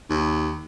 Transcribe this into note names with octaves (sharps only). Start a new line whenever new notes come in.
D#2